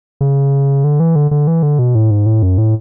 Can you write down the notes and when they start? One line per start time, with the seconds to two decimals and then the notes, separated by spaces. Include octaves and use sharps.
0.21 C#3
0.84 D3
1.00 E3
1.16 D3
1.31 D3
1.47 E3
1.63 D3
1.79 B2
1.95 A2
2.11 G#2
2.26 A2
2.43 F#2
2.58 A2